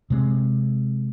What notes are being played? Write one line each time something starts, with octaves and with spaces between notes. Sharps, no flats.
C3 G#3 C4